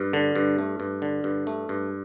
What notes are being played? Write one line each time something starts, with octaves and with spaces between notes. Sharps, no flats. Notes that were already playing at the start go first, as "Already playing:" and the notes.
Already playing: G2
D3
G2
A3
G2
D3
G2
A3
G2